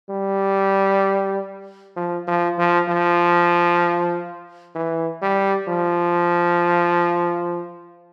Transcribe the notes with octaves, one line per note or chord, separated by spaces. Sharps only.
G3
F3
F3
F3
F3
E3
G3
F3